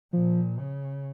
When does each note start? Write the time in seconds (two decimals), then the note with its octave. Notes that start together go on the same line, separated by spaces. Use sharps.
0.13 A#2 F3
0.59 C#3